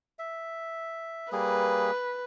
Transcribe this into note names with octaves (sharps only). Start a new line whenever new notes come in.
E5
G3 A#3 G#4 B4